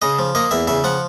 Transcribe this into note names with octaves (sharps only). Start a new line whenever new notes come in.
C#3 D#5
F3
A#3 D#5
E2 E5
C#3 E5
F3 F#5